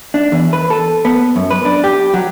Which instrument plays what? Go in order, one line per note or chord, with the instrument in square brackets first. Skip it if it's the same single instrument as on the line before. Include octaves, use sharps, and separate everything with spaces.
[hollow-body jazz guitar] D4
E2
B4
A4
B3
F#2
B4
D4
G4
F#3